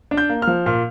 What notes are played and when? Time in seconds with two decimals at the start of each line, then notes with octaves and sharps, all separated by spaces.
0.11 D4
0.17 G6
0.29 A#3
0.42 F6
0.47 F3
0.66 A#2 F6